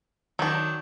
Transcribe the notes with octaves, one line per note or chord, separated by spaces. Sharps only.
D#3 F#3 D4